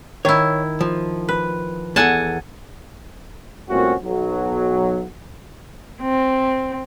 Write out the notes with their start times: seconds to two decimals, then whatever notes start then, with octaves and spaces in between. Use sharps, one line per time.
0.25 D#3 E4 C#5
0.81 F3
1.29 B4
1.96 E2 A4 F#5 G#5 A5
3.69 C2 A#2 A3 C4 C#4 F#4
4.04 B1 F#3
6.01 C4